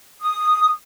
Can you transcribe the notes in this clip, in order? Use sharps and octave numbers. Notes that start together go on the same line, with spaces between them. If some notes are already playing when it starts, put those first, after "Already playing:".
D#6